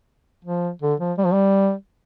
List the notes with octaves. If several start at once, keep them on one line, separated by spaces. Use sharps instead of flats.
F3
D3
F3
G3
F3
G3